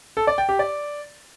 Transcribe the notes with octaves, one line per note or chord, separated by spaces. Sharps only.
A4
D5
G5
G4
D5